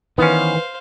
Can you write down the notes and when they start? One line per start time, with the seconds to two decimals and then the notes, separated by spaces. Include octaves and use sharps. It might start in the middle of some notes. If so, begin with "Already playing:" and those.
0.18 D#3 E3 B3 C#4 B4 C5 F5